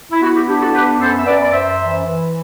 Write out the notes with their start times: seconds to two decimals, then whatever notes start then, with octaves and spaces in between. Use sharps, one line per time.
0.12 E4
0.21 B3 F#4
0.34 E4 G4
0.47 D4 E4 G4
0.61 F#4 A4
0.74 B3 G4 B4
1.00 F#2 A4 C5
1.17 E5
1.26 F#2 B4 D5
1.42 D5
1.52 F#2 C5 E5
1.79 E3
2.05 E3